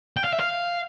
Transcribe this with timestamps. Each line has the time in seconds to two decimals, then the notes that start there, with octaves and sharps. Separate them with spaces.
0.17 G5
0.24 F5
0.32 E5
0.40 F5